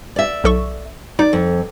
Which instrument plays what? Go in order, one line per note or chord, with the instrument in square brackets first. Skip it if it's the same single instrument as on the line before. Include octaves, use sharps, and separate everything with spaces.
[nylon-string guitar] D5 E5
[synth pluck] B1 A4 C#6
[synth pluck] D#4 [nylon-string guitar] D5
[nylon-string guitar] F2